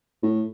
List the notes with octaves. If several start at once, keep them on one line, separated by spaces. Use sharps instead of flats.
A2